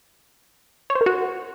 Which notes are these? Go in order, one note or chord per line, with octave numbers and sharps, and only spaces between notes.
C#5
C5
A#4
F#4